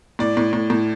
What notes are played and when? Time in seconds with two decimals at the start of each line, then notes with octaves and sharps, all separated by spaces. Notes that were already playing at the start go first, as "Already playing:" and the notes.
0.19 A2 D5
0.37 A2
0.53 A2
0.70 A2